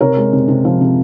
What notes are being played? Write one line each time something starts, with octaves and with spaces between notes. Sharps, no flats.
C3 A#4 C#5
G#3
C3
C3
F3
C3